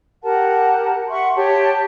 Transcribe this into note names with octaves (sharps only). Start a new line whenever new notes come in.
G4 A#4 F#5 A5
E5 F#5 C6 C#6
G4 C#5 A5